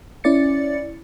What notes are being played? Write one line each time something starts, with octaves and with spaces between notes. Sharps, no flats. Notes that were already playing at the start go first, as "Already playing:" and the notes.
C#4 E4 D5 A6 C#7